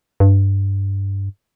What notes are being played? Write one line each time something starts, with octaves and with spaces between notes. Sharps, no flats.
G2